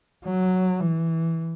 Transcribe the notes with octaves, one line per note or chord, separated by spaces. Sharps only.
F#3
E3